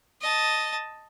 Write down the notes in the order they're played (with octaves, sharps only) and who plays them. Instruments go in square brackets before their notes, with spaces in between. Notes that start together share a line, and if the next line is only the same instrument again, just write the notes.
[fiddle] D#5 A5